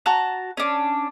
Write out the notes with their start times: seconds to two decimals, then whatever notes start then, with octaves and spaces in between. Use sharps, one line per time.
0.06 F#4 A5 A#5
0.57 C#4 D4